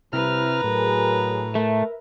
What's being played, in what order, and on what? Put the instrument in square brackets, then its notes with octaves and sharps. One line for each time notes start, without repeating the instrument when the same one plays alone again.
[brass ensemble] C2 [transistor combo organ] C3 E4 F6 [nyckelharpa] B4 A#5
[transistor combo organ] A2 [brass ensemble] F#3 G#4 A#4
[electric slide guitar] A3 [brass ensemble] A#4 E5